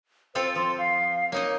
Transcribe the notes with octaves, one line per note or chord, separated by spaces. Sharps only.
C4 F4 A4 C5
F3 C6
F5
A#3 D#4 C#5 D#5